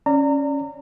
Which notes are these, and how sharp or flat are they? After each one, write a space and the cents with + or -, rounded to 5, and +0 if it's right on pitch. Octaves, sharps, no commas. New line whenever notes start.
C#4 +0 D5 +0 A#5 -30